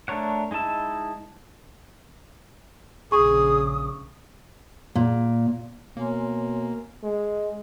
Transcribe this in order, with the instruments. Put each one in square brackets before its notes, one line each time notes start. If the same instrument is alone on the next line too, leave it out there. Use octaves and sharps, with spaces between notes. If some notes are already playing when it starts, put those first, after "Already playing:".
[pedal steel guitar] A3 D4 A#4 C#5 F#5
G#3 D#4 E4 A5 E6
[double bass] A#1 C#3 [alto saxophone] G#4 [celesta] C#6 [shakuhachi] D#6
[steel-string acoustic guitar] A#2
[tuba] B2 [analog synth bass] A#3 [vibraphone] C#5 G#5 C6
[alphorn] G#3